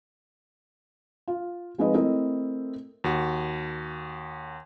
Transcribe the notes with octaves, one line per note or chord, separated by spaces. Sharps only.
F4
F3 G#3 C4 D#4 B4 D#5
A3 C4 E4 A#4 D#5
D#2 F#4